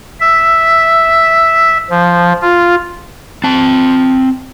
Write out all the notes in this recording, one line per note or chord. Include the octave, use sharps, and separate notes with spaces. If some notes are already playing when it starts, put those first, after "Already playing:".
E5
F3
F4
C4 A5